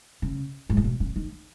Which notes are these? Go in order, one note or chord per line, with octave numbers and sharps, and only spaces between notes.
C#3
G#2
A#2
B2
C#3
D#3